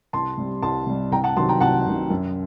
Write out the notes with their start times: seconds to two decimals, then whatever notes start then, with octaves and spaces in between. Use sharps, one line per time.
0.13 C2 A5 C6
0.38 C3 G3
0.63 C2 A5 C6
0.87 C3 G3
1.12 C2 G5 A#5
1.24 F#5 A5
1.36 C3 D#3 F#3 A5 C6
1.49 G5 A#5
1.61 C2 F#5 A5
1.86 C3 D#3 F#3
2.10 F#2